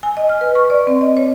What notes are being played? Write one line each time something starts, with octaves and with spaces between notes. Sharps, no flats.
G#5
D#5
F6
B4
C#6
D5
C4
D#5
C#5